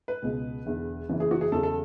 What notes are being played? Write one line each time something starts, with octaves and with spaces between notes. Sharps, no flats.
B4
C#2 B2 G#3 B3
E1 E2 D3
F#1 F#2 E3
G#4
F#4
G#4
E2 C#3 F#3 A4
A4